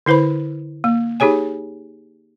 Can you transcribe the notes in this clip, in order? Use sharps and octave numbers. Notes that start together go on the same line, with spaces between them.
D3 E4 B4 C5 B5
A#3
D#4 G4 G#4 C#5 G#5